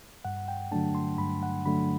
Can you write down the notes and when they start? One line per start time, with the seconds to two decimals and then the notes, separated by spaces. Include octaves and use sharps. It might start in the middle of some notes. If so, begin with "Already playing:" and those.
0.25 G2 F#5
0.48 G5
0.72 D3 F#3 A3 D4 A5
0.95 C6
1.18 G2 B5
1.43 F#5
1.66 D3 F#3 A3 D4 B5